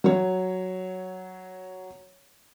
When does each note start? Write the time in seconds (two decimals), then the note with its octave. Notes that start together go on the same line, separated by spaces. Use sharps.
0.04 F#3 C#5